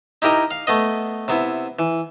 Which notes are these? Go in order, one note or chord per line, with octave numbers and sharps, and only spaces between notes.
D#4 E4 G4 A#4 D#5
F5
A3 B3 D#5
C3 B3 E4
E3